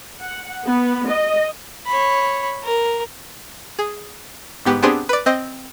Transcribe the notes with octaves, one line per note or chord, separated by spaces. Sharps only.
F#5
B3
D#5
C#5 B5
A#4
G#4
G1 G#2 B3 G4
B3 C4 D4 G4 G#4 C5
B4 D5
C4 C5 D#5